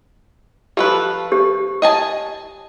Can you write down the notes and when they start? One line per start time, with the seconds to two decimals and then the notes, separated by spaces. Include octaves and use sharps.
0.77 F3 G4 A4 B4
1.32 G4
1.82 D#5 G#5 A5